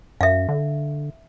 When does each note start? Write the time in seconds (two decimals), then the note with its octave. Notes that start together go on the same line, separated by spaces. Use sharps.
0.21 F#2 E5 F5
0.49 D3